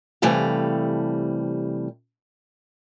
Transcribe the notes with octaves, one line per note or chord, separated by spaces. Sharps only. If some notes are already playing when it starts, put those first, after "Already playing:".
C3 E3 G3 A3 F5